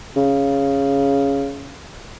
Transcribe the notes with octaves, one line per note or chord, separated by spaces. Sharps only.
C#3